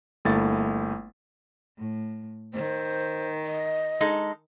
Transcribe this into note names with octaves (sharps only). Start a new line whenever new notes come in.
G1 A3 A#3 E4 A6
A2
D#3 C5
D#5
G#3 D#4 A4